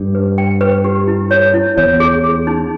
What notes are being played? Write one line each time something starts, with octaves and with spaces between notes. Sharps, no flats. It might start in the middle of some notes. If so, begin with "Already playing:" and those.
Already playing: G2
B4
G5
B4
G4
E4
C#5
E4
E2 C#5
G#4
G#4
D#4